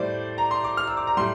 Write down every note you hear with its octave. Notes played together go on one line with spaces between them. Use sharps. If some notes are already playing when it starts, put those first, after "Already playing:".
Already playing: A2 G3 C5 D5
A#5
C6
D6
F6
E6
D6
A#5
A2 G3 C6